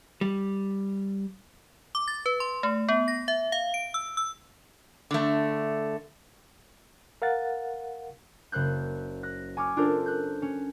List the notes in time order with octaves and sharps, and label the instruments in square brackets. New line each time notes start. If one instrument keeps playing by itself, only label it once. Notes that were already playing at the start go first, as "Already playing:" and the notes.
[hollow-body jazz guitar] G3
[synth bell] D6
A6
B4
C6
A3
B3
A#6
E5
F5
D7
E6
E6
[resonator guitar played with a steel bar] D3 A3
[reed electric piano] A#4 F5 F#5 A6
[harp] F#1 C5 F#6 G6
F#6 A#6
G#5 C#6 D6 F6
C#4 D4 F4 A4 A#4 C5
F#6 G6
C#4